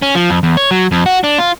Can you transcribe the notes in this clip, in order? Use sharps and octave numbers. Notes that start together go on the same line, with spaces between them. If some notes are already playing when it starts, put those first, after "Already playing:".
C#4
F3
F2
E2
C#5
F#3
F2
F#4
D4
F4